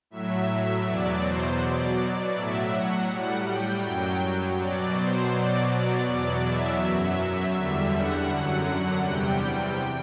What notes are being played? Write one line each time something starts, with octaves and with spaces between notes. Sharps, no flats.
A2 F#3 E5
E2 B2 F#3 D5
C5
B2 F#3 D5
A2 F#3 E5
F#5
A2 G3 F#5
G5
F#2 F#3 G5
B2 F#3 D5
C5
B2 F#3 D5
D5
E2 B2 F#3
E5
F#2 F#3 E5
E2 D3 G3
F#5
F#2 D3 F#3 F#5
E2 C3 G3 G5